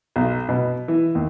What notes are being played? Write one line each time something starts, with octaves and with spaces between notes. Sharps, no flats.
B1
B2
E3
D#2